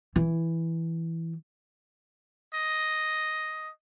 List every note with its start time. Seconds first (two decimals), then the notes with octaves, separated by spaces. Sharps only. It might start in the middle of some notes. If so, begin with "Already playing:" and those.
0.16 E3 E4
2.54 D#5